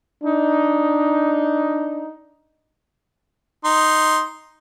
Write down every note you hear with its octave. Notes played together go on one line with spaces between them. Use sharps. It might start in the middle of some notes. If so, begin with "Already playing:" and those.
D4 D#4
D#4 C6